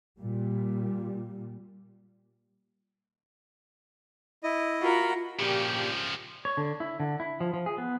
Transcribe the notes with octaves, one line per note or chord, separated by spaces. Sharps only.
A#2 G3
E4 D#5
F4 F#4 A#4 F#5 B5
A#2 C#3 F3 D4 G4
C#5
D3
E4
D3
E4
F3
F3
G#4
B3